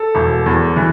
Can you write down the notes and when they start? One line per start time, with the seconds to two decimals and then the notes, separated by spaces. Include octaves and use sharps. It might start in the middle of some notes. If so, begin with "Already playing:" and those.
Already playing: A4
0.15 E1
0.46 E2
0.76 E3